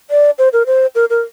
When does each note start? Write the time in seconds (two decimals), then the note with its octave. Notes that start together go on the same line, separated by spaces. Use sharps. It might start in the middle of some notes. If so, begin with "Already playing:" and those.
0.10 D5
0.39 C5
0.53 A#4
0.67 C5
0.95 A#4
1.10 A#4